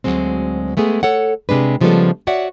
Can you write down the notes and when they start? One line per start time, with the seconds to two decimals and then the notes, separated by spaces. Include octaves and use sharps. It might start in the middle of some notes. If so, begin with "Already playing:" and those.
0.04 D2 G#2 F#3 G#3 C4
0.77 G#3 A3 B3 G#4
1.03 A4 C#5 F#5
1.49 C3 G#3 D4 B4
1.81 C#3 F3 G3 G#3 B3 A4
2.27 F#4 C#5 D5 E5 F#5